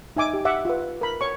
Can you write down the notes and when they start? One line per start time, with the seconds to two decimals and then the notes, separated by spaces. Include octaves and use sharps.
0.16 D#4 E5 G#5 D6
0.34 G4
0.45 E5 F#5 D6
0.65 F4 B4
1.01 A#4 B5
1.21 C#5 C#6